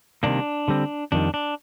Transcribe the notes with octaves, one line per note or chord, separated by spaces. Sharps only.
C3 D#3 G3 A#3 D4
D3 G3 C4
F2 D#3 G3 D4
D4